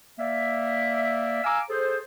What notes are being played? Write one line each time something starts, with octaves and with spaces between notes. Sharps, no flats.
A#3 D5 E5
F5 G#5 A#5 D6 E6
G#4 A4 C5